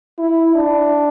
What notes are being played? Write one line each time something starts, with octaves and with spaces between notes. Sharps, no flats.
E4
D4